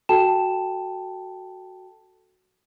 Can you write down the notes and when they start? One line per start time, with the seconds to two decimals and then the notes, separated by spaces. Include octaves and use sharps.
0.09 F#4 A4 G5 A5 E7